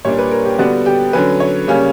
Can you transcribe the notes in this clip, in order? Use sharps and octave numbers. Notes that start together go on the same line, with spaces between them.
A#2 G3 A#3 D4 C#5
B4
A#4
G4
D3 G3 B3 D4 F#4
G4
D3 F#3 C#4 B4
C#5
C#3 G3 A#3 C#4